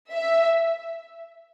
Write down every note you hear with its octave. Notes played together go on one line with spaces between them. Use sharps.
E5